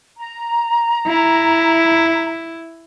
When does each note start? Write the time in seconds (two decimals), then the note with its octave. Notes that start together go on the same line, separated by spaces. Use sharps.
0.19 A#5
1.08 E4